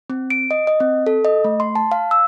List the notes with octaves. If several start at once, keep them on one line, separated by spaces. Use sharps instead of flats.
C4
D7
D#5
D#5
C4
A4
D#5
A3
C6
A5
F5
E6